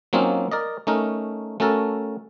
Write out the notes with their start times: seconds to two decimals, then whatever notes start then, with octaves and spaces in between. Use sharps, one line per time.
0.13 F#3 A#3 C4 C#4 D#4 F4
0.51 A#4 D5 D#5
0.87 A3 C#4 D#4 A#4
1.60 A3 C#4 F#4 A4 A#4